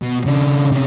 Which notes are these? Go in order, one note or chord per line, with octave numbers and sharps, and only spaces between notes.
B2
C#3 D4
C3 C#4